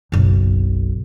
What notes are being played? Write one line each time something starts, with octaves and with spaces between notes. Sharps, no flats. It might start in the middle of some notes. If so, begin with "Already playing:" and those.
F#1 B1